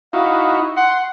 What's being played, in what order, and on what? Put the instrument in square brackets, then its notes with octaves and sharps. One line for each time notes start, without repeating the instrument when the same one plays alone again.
[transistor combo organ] D#4 E4 F#4 [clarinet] F5
[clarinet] F#5 [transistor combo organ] C6